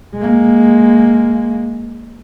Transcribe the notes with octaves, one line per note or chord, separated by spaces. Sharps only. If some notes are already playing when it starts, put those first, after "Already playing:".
G#3 A#3